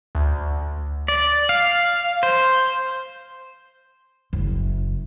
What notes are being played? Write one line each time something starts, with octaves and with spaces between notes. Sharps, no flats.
D2
D5
F5
C5
F#1